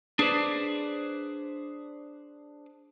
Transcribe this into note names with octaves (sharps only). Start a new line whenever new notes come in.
D4 G#4 B4 C5 D5